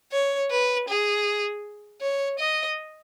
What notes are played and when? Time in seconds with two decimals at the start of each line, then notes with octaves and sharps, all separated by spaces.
0.12 C#5
0.51 B4
0.88 G#4
2.01 C#5
2.39 D#5